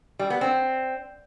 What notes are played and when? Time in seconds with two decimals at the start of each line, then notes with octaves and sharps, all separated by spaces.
0.19 G3
0.30 B3
0.41 C4